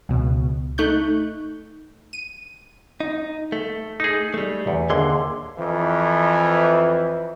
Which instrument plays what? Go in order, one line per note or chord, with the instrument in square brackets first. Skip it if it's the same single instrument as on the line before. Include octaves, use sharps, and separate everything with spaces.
[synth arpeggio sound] C#2 B2
A3 D#4 C#6 F#6 G6
D#7
[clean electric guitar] D#4
A3
[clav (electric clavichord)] D#4 G#4
[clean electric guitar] G3 A3
[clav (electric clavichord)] E2
[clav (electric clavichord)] D#2 D3 [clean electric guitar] G#4 C6
[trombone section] F2 E3